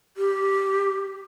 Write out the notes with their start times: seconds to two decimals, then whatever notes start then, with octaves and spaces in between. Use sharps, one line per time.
0.17 G4